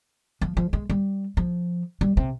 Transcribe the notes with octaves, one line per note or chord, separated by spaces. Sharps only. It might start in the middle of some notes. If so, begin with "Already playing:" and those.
F3
F3
G#3
G3
F3
G3
C3